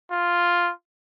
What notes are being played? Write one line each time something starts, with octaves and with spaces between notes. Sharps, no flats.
F4